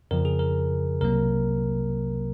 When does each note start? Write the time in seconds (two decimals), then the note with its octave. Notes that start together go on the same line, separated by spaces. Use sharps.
0.11 F2 C#3 F3 A#4
0.25 G#4
0.39 A#4
1.01 C2 C3 F#3 A#3 A#4